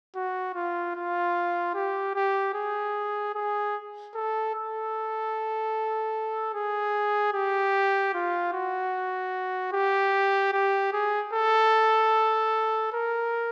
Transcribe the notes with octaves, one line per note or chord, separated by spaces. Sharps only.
F#4
F4
F4
G4
G4
G#4
G#4
A4
A4
G#4
G4
F4
F#4
G4
G4
G#4
A4
A#4